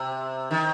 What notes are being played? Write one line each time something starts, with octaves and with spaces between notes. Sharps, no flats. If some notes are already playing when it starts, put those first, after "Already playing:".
Already playing: C3
D#3